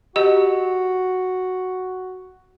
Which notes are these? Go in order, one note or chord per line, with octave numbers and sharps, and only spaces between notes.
F#4 G4 D#5